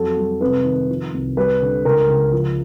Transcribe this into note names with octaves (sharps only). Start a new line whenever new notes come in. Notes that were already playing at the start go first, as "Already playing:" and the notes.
Already playing: F2 F#3 A4
G3
C3 B4
D#3
F3
C2
G3 B4
D3
C#2 A#4
C#2
F3